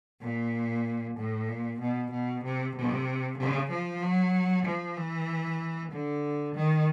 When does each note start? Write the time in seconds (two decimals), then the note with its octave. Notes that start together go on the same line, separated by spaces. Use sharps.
0.21 A#2
1.17 A2
1.49 A#2
1.81 B2
2.11 B2
2.44 C3
2.76 C3
3.38 C#3
3.70 F3
4.02 F#3
4.66 F3
4.97 E3
5.92 D3
6.55 D#3